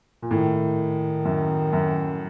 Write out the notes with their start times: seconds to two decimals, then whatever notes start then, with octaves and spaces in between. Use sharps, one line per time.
0.22 A#2
0.31 A2 D#3
1.25 F#2
1.73 F#2